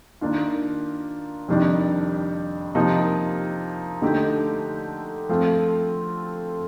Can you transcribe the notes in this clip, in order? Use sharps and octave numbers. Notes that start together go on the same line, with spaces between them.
D#3 A#3 D4 F4
F2 C3 D#3 G3 D4
C3 F3 A#3 D#4
D3 A3 D#4 G4
F3 A3 C4 F4